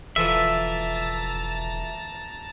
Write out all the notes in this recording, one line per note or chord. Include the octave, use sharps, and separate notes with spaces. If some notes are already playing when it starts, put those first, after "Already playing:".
E1 D3 E3 F3 E5 A5 A#5